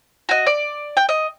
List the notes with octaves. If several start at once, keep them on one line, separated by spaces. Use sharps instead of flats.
F#4 D#5
D5
G5
D#5